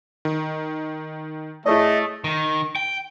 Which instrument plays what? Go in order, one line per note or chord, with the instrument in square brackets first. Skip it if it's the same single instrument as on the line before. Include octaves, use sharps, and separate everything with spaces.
[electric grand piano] D#3
[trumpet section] A3 [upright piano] E4 G#4 C#5 [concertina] D#5
[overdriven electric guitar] D#3
G5